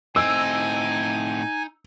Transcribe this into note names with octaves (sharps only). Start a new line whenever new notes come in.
A2 C4 D#4 G#5 E6